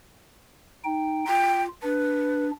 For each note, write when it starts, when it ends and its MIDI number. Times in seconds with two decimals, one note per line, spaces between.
0.84 1.25 63
0.84 1.25 79
1.27 1.68 65
1.27 1.62 79
1.83 2.51 62
1.83 2.46 71